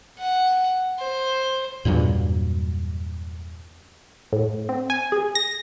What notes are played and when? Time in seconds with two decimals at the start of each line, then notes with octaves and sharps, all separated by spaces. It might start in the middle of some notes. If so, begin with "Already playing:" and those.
0.18 F#5
0.99 C5
1.85 E2 G2 A#2 F#3
4.33 A2
4.69 C4
4.90 G#5
5.12 G#4
5.35 A#6